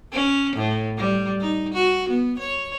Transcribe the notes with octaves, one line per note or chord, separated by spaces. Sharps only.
C#4
A2
G3
D#4
F#4
B3
C#5